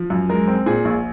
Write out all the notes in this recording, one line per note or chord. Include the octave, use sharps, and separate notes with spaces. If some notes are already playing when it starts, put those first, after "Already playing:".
Already playing: F3
F#2
G#3 A#4
C4
A#2 G#4
A#1